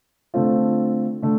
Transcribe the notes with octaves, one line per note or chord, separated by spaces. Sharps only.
D3 A3 C4 F4
D3 A3